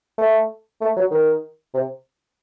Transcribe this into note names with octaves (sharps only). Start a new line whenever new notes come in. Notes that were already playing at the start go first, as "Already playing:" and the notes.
A3
A3
F#3
D#3
C3